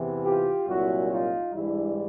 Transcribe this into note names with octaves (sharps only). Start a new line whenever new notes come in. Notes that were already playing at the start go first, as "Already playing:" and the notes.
Already playing: E2 C3 E3
F4 G4
C2 A#2 F#3 E4 F#4
D#4 F4
G#2 E3 G3 D4 E4